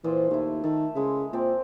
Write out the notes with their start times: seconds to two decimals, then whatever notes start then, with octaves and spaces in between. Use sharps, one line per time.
0.04 A#2 E3 F3 C6
0.31 D#2 A3 E4
0.64 D#3 E4 A4
0.95 C#3 G#3 E4
1.33 A#2 C4 D5 A5